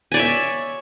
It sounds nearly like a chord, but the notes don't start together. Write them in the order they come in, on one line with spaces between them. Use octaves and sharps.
G#5 D5 C#5 E5